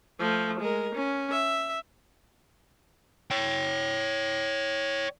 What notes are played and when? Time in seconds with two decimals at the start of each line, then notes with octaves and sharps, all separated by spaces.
0.20 F3 A3
0.60 G#3 A#4
0.95 C#4
1.32 E5
3.31 C#5 G5